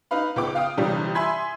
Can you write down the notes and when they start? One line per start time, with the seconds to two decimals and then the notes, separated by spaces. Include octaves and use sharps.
0.11 D#4 B4 F5 B5
0.36 C#2 B3 G5 D6
0.54 F4 F5 G5 D#6
0.78 G1 G2 C3 E3 G3
1.15 E5 G#5 B5 C6 G#6 B6